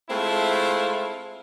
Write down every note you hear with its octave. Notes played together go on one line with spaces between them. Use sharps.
G#3 A3 C4 E4 F4